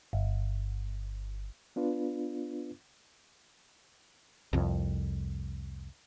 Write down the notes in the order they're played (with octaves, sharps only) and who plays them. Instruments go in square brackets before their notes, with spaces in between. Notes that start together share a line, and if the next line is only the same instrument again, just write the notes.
[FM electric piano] G1
[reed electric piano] B3 D4 F4 B4
[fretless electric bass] C2 F2